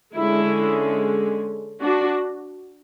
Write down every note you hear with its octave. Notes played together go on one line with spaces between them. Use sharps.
D3 G#3 C#4 E4
D4 F#4